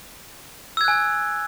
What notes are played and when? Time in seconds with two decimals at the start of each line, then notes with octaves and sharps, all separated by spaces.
0.77 E6
0.81 G#6
0.84 F#6
0.88 G#5